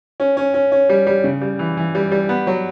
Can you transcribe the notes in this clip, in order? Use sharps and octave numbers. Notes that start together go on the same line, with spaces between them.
C#4
C#4
C#4
C#4
G3
G3
C#3
G3
E3
E3
G3
G3
B3
F#3